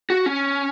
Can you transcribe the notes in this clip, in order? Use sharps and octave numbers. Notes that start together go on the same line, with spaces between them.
F#4
C#4